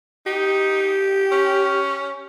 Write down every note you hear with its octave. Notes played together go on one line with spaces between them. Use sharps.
D#4 G4
C#4